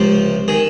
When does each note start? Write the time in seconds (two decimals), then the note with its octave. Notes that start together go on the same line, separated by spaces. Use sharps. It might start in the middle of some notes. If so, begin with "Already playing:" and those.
Already playing: C#2 C3 F3 C5
0.48 D#3 G#4